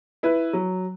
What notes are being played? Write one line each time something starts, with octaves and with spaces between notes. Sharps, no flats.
E4 B4
F#3